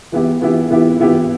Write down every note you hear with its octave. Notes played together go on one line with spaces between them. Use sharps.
E3 B3 E4 G4
E3 B3 E4 G4
E3 B3 E4 G4
E3 B3 E4 G4